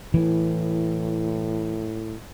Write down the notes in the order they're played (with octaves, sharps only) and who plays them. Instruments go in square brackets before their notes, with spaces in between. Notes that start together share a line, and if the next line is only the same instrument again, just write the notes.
[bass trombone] A2 [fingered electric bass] E3